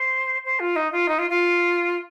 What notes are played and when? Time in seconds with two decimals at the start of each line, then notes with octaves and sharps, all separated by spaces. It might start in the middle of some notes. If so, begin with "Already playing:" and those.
Already playing: C5
0.44 C5
0.59 F4
0.76 D#4
0.92 F4
1.08 D#4
1.18 F4
1.30 F4